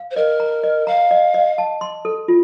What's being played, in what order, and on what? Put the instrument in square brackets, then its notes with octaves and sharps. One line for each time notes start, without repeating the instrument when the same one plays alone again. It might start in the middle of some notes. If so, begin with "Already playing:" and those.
Already playing: [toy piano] F5
[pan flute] C5
[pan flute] A#4 [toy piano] D#5
[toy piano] A#5
D#5
[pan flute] F5 [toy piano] A#5
[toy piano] D#5
D#5
A5
C6
A4
F4